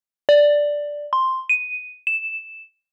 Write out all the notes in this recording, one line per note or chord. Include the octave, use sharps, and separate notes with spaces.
D5
C6
D#7
E7